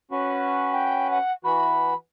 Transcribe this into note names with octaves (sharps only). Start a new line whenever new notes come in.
C#4 F#4 B4
G5
F#5
E3 F#4 B5